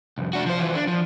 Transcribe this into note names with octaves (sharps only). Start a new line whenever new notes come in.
C2 F2
D4 F#4
F3 C5
E3 F4
D4
F3